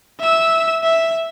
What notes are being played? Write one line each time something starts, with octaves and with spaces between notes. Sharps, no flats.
E5 E6
E5